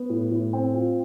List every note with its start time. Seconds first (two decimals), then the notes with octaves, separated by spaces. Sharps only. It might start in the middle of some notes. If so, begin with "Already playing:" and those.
Already playing: B3
0.09 A2
0.31 A2
0.53 C4
0.74 F4